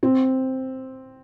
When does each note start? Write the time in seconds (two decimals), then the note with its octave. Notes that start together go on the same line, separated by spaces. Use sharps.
0.03 C4